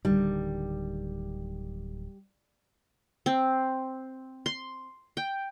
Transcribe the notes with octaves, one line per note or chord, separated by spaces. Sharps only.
D1 D3 D#3 G3
C4
C6
G5